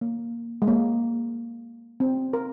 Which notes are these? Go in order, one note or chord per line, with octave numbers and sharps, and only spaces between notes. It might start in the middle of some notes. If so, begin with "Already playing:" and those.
A#3
G#3
A#3
C4
A#4